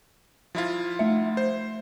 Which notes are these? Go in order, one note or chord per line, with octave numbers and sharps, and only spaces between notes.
F3 E4 F4
A3 E5
C5